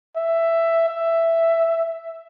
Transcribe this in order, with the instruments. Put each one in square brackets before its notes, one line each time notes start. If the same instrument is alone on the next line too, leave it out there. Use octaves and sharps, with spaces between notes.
[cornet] E5
E5